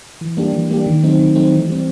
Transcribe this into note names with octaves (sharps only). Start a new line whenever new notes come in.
E3
G3 A#3 D4 G4
E3
G3 A#3 D4 G4
D#3
F#3 A3 C4 D#4
D#3
F#3 A3 C4 D#4
E3
G3 C4